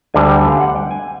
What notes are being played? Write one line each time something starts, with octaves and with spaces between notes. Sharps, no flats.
D2 D3 G3 G#5
G5
G#5
F5
F#5
G5
G#5